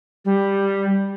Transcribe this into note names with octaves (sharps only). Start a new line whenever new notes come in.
G3